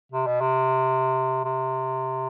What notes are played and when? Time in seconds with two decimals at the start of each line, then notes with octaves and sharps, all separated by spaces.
0.12 C3
0.27 B2
0.41 C3
1.45 C3